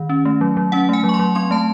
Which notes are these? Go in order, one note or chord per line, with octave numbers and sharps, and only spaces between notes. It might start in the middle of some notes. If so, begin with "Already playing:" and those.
Already playing: D#3
C#4
A3
F#3
F#3
C#4 F#5
A3 G#5
F#3
C#6
C6
F#3
C4 C6
A3 A5